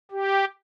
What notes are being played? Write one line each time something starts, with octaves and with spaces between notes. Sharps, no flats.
G4